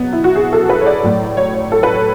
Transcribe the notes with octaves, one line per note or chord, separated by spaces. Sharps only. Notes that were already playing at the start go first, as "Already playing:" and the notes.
Already playing: B2 F#3 B3
E4
F#4
G#4
A4
B4
C#5
D5
A2 F#3
C#5
C#5
A4
B4
C#5